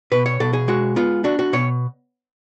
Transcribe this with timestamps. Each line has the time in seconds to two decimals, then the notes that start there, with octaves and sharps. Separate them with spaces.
0.12 B2 B4
0.26 C#5
0.40 B2 A4
0.53 G#4
0.68 G#3 F#4
0.96 B3 F4
1.24 D4 F#4
1.39 F#4
1.53 B2 C#5